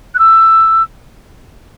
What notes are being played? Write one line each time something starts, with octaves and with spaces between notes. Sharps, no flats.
F#6
E6